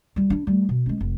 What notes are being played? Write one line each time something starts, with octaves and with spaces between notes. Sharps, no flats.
G3 E4
D4 E4
G3 A3
B2
G#3 C#4
F1